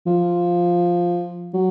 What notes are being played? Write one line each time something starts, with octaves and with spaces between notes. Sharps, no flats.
F3
F#3